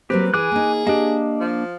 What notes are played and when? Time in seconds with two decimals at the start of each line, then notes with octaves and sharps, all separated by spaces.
0.10 F#3 A#3 C4 G4 B4
0.34 E3 G#4 G#5 D6 F#6
0.52 A#3 D#4
0.87 A#3 D4 G4 D#5
1.40 F3